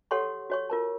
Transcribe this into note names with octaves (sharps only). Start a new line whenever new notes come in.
G4 A4 C#5 F#5 C6 C#6
F#4 C#5 C#6
F4 A#4 A5